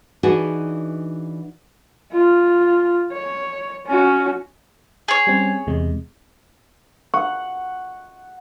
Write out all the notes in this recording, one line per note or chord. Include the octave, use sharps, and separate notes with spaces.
E3 D4 D#4 F#4 G#4
F4
C#5
C#4 F#4
G#4 C#5
G3 C4 C#4
E2 C3 G#3
F#5 C#6